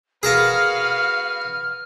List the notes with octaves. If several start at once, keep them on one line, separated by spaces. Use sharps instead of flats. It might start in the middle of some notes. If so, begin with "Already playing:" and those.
F#4 G#4 A#4 B4 F5 A5 F6